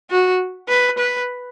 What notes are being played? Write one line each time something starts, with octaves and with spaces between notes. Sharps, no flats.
F#4
B4
B4